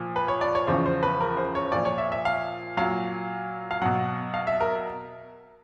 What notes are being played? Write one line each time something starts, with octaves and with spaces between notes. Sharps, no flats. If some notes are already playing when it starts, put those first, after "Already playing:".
Already playing: A#2 F3
B4
C#5
D5
C#5
E2 C#3 F3 C5
C5
B4
A#4
C5
C#5
A#2 F3 D5
C#5
E5
E5
F5
A#2 F#3 F5
F5
B2 F#3 F#5
F5
E5
A#4